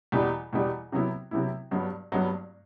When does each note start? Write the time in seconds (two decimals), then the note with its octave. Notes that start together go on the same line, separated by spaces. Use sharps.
0.12 E2 B2 G3
0.53 E2 B2 G3
0.92 C3 F#3 B3 E4
1.31 C3 F#3 B3 E4
1.71 G2 F#3 B3
2.12 G2 F#3 B3